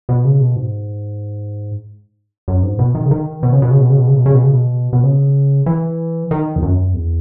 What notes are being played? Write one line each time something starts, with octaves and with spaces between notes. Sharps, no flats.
B2
C#3
B2
G#2
F#2
G#2
B2
D#3
C#3
D#3
B2
C#3
B2
C#3
B2
C#3
B2
C#3
B2
C#3
B2
C#3
B2
B2
C#3
E3
D#3
E2
F#2
E2